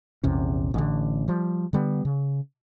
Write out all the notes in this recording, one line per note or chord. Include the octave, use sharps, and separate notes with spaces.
A#1 E2 C3 C#4
A1 D3
F3 G3
D3 G3 B3
C#3